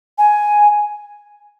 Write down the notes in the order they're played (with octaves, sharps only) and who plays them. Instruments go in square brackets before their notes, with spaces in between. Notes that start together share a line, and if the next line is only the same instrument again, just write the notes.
[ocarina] G#5